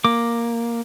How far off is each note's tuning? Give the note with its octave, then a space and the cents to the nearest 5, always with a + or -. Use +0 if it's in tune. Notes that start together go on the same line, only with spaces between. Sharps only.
A#3 +0 D6 +0